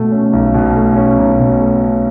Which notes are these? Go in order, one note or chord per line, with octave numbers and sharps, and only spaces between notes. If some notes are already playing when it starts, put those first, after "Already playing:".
Already playing: B2 A3
C#4
B1
B2
A3
C#4
B1
B2
A3
C#4